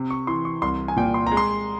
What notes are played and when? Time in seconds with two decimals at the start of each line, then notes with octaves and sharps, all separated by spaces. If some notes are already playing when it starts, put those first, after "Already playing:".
Already playing: C3
0.10 C#6
0.27 E3 C6
0.45 C#6
0.62 C2 C6
0.88 G#5
0.96 A#2 G5
1.14 C6
1.27 A#5
1.32 G#3
1.37 C6